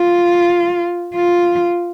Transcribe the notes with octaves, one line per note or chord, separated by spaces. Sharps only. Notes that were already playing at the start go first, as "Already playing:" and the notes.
Already playing: F4
F4